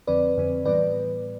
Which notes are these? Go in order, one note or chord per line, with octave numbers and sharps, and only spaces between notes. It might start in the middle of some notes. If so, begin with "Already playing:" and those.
F2 D3 F3 C4 B4 D5
F2 D3 F3 C4
A2 E3 G3 B3 B4 D5